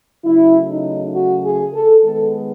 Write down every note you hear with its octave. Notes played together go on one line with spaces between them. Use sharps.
C#3 F#3 A3 E4
D#4
F#4
G#4
A4
D#3 G#3 B3 A4